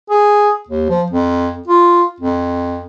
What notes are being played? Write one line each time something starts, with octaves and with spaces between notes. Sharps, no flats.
G#4
D#2
F3
F2
F4
F2